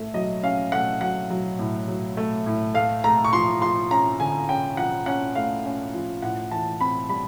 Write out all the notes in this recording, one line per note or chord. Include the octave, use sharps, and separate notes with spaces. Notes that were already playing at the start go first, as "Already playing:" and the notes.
Already playing: A2 A3 E5
F#3 D#5
C#4 F5
A3 F#5
F#3 F#5
F#3
A2
F#3
A3
A2
A3 F5
A3 A#5
C#6
F3 C6
F3 C6
C#4 A#5
D3 G#5
C#4 G5
F3 F#5
C#4 F#5
A3 F5
C#4
F3
A2 F#5
E3 A5
C4 B5
G3 B5